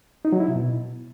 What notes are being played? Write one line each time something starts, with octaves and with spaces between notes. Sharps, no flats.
D#4
F#3
E4
C3
B2